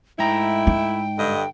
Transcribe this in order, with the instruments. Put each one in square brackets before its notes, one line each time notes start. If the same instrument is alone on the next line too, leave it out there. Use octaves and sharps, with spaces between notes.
[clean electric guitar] G#2 A#5 [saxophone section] A3 E4 [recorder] G5
[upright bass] D#4
[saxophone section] G2 D3 D#5